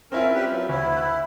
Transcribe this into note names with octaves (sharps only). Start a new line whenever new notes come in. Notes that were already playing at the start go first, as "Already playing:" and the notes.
C4 C#4 E4 F4 A#4
G3 G4 B4
F3 F#3
D2 E4
E5 E6 F#6